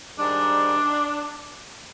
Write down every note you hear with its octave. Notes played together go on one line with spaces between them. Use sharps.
G#2 D#3 G3 D4